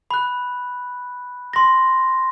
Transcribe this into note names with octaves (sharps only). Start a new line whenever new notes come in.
B5 F#6
C6 A#6